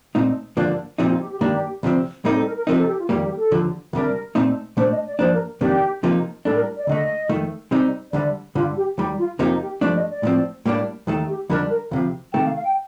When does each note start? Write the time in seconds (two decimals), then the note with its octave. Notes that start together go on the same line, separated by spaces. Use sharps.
0.15 A#2 A3 C4 D#4
0.57 G2 D3 F3 A#3 D4
0.98 C2 A#2 F3 C4 D#4 G4
1.09 F4
1.20 G4
1.30 G4
1.41 G2 D#3 A#3 D4 G4
1.83 D2 C3 F3 C4
2.24 A2 G3 C4 D#4 A#4
2.36 A4
2.46 A#4
2.57 A#4
2.67 C3 F3 C4 D#4 A#4
2.78 A4
2.88 G4
2.98 F4
3.09 F2 D#3 G3 A#3 G4
3.23 G4
3.37 A4
3.51 D#2 D3 F3
3.93 D2 C3 G3 D4 A#4
4.35 A#2 A3 C4 D#4
4.77 A#2 A3 D4 C5
4.91 D#5
5.06 D5
5.19 G2 F3 A#3 D4 C5
5.33 A#4
5.61 F2 C3 D#3 A#3 D4 G4
6.03 C3 F3 A#3 D#4
6.45 A2 G3 D4 A4
6.55 A#4
6.77 D5
6.87 D2 D3 A3 D#5
7.29 F2 D#3 A3
7.71 C3 G3 C4 D#4
8.13 D2 D3 G3 D5
8.55 G2 D3 G3 F4
8.77 G4
8.97 D#2 D#3 G3 G4
9.18 F4
9.39 F2 C3 F3 A#3 D#4 G4
9.61 G4
9.81 G2 F3 A3 D4 D5
9.95 D#5
10.10 D5
10.23 A2 F3 C4
10.66 A2 G3 A#3 D4
11.07 D#2 D#3 A3
11.28 G4
11.50 F2 D3 G3 D4 A#4
11.70 A#4
11.91 D2 C3 F3 F5
12.33 C3 D#3 A3 G5
12.44 F5
12.55 F5
12.65 G5